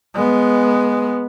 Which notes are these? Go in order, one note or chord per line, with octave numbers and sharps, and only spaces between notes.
G#3 B3